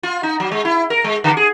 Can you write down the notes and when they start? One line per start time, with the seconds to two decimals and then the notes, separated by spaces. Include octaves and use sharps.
0.03 F4
0.23 D#4
0.40 F#3
0.52 G#3
0.65 E4
0.90 A#4
1.04 G#3
1.24 D3
1.37 G#4